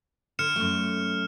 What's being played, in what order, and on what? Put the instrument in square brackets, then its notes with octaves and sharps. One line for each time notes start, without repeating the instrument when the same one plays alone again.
[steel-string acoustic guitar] D3 [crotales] F6 C#7 E7
[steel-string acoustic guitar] F#2 A3